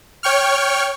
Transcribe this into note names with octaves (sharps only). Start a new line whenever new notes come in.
C#5 G5 C#6 F6